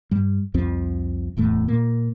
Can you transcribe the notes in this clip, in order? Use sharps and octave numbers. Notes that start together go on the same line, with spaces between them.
G2 G3
C2 F2 F3 C4
D1 E2 A2 A3
A#2 A#3